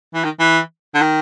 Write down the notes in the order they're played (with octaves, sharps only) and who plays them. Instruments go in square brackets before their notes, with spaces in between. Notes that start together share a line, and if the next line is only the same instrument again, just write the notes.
[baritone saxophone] E3
D#3
E3
D3
D#3